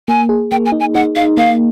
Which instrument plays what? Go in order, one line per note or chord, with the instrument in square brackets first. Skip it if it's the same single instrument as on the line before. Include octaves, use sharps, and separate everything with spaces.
[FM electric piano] A#3 [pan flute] G#5
[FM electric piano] G#4
[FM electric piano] A#3 [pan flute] G5
[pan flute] G#5
[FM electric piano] D#4
[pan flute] G#5
[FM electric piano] D#4 [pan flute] F#5
[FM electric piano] D#4 [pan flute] F5
[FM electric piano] A#3 [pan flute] F5